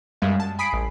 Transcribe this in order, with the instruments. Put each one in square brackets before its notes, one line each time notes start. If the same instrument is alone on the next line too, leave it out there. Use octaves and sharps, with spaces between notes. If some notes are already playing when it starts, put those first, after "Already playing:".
[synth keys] F#2 G3 G#3 F5
A5
G#5 B5 D#6 B6 C7 D7
A1